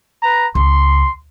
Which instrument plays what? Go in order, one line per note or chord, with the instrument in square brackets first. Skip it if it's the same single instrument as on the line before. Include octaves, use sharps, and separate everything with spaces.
[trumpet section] B4 A#5
[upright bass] C#2 [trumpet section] C6